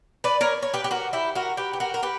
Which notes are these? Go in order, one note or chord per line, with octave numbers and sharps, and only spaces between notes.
B4 D5
A#4 C#5
C#5
G4 B4
G4
F#4 A#4
E4 G4
F#4 A#4
G4 B4
G4
F#4 A#4
A#4
G4 B4